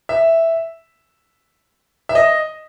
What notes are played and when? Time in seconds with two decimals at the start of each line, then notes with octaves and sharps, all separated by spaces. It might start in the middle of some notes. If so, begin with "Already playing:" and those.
0.09 E5
2.09 E5
2.15 D#5